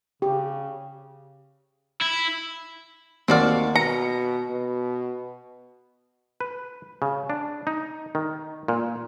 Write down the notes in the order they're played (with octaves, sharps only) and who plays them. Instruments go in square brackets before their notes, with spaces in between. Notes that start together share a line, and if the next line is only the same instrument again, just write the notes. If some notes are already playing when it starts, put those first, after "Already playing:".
[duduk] C#3 [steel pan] G4
[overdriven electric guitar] E4
[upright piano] D#2 F#5 F6 [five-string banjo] C4 F#4 D5
[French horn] B2 [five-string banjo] A#5 [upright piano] C#7
[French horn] B2
[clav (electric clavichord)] B4
C#3
D4
D#4
D#3
A#2